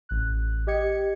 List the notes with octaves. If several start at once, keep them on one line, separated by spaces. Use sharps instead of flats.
A1 F#6
G4 D#5 G5 G#6 C#7